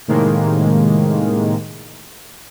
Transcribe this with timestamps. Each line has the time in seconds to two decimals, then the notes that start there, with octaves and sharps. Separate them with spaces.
0.08 A2 C3 D#3 G#3 A#3